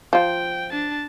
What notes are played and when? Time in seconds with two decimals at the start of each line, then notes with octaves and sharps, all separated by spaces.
0.13 F3 F4 G5
0.72 D4 A5